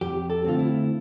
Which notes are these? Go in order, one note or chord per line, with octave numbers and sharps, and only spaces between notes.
F2 G4
A4
D3 A3 C4 F4
E4